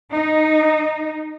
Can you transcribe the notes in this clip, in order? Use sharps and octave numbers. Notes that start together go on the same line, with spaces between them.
D#4